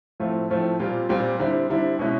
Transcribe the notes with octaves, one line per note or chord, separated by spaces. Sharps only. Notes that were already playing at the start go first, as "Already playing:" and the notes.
A2 F3 A3 C4 F4
A2 F3 A3 C4 F4
A#2 G3 C4 F4
A#2 G3 C4 F4
D3 G3 C4 E4
D3 G3 C4 E4
B2 G#3 C#4 E4